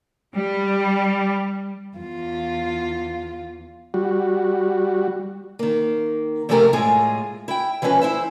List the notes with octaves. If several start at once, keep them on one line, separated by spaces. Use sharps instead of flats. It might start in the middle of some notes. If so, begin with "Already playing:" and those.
G3
E2 F4
G3 F#4
D#3 A#3
C3 E3 F3 A3 G4 A#4
A2 G#3 F4 G#4
E4 G5
E3 F3 G#3 C#4 B4
E4 C5 E5